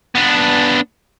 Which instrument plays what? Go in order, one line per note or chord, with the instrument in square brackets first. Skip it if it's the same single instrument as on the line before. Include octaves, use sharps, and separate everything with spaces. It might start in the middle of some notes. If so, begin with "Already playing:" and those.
[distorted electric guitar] B3 D4